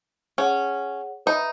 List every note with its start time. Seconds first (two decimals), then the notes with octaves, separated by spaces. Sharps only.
0.38 C#4 G#4 C#5 F#5
1.26 D#4 B4 E5 B5